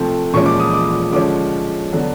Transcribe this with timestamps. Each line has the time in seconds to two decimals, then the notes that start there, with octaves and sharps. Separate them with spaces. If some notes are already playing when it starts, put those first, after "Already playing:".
Already playing: C3 F3 A3 C4
0.34 A#2 F3 G#3 C#4 C#6
0.46 D6
0.60 D#6
0.74 D6
1.13 D3 F3 G#3 C#4 D6
1.93 D3 F#3 B3 D4